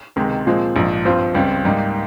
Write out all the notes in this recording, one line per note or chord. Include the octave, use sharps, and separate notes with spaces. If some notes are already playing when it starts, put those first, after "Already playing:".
C#2 C3 D#3 G#3
A#2 F3 G#3 C4
A#1 G#2 F3
G2 F3 C4 F4 C5
C#2 C#3 G3 C4
G#2 G3 A#3 D#4